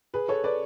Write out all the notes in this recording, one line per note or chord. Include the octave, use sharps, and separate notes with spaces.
G#4 B4
A4 C#5
B4 D5